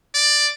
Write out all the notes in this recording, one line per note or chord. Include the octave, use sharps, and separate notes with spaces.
D5